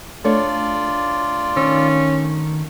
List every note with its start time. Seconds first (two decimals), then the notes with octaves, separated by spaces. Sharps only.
0.24 A3 D4 F4 C#5 D5
1.56 D#3 C#4 E6